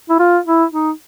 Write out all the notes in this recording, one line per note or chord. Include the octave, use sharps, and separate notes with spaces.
E4
F4
E4
D#4